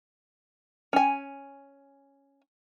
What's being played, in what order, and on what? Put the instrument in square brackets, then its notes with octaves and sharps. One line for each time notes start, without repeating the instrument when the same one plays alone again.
[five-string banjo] C#4 G#5